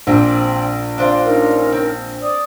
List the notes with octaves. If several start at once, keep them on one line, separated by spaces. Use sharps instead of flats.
A#1 C4 D4
D4 F4 C5
C#4 D#4 A#4
C4
D5 D6 D#6